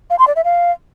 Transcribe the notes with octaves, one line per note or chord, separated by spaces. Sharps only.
F5
C6
D5
E5
F5